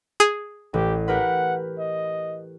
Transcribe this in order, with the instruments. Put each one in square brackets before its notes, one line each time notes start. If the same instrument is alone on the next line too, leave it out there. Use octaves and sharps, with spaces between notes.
[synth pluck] G#4
[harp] A1 [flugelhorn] G4
[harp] G4 A#4 B4 [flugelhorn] F#5
[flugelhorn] D#5